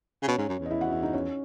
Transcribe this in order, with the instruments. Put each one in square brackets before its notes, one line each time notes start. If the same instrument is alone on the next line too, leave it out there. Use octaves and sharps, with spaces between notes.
[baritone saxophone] C#3
[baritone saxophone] B2 [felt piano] C#4 C#5
[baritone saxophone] G#2
F#2
E2
[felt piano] D#5
E4 E5
F#4 F#5
E4 E5
D#4 D#5
C#4 C#5